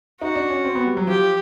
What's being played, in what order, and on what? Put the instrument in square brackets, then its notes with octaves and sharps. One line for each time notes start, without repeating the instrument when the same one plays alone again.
[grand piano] D#4 [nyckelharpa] F#4
[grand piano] D4
C#4
C4
B3
G3
F#3
[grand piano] F3 [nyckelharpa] G4